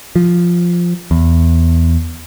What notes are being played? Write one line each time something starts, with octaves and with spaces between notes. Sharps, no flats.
F3
E2